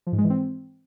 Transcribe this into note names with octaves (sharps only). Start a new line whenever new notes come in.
F3
G#2
G#3
E3
C4